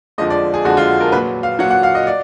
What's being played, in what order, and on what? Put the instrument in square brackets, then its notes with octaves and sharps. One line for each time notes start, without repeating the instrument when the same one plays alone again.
[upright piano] F2 D3 F3 G#3 D#5
D5
G#4
F2 D3 F3 G#3 F#4
F4
A#4
A#2 F#3 B4
F5
A#2 F#3 F#5
F#5
F5
D#5
D5